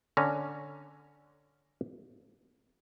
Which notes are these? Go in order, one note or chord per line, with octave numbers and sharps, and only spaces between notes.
D3 C#4 A#5